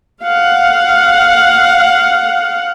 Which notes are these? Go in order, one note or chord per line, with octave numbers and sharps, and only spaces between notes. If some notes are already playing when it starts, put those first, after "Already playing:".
F5 F#5